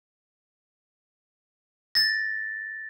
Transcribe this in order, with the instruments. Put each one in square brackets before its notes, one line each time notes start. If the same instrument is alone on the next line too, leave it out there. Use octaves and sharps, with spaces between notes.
[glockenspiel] A6 A#6